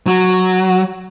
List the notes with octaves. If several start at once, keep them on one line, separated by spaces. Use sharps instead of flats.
F#3